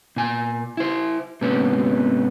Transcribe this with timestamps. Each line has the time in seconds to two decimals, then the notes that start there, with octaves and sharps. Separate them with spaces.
0.16 A#2 G#5
0.77 E4 C5
1.41 G#2 C3 A#3 B3 C#4